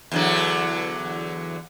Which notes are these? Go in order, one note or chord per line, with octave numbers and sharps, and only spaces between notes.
E2 D3 F#3